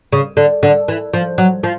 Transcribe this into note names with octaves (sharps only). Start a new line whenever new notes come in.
C#3
D3
D3
E3
F3
F#3
F3